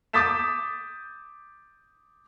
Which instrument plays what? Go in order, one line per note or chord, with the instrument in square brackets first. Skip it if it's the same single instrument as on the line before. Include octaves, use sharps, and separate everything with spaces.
[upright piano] D6 D#6 G6 A6 B6 E7